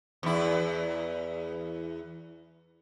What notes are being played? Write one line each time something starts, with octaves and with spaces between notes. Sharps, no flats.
E2 E4